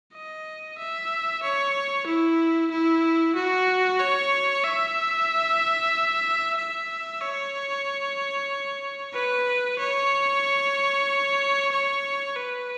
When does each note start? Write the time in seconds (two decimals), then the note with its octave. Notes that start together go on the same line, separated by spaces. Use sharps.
0.14 D#5
0.78 E5
1.42 C#5
2.06 E4
2.71 E4
3.35 F#4
4.00 C#5
4.64 E5
6.57 E5
7.21 C#5
9.14 B4
9.79 C#5
11.72 C#5
12.36 B4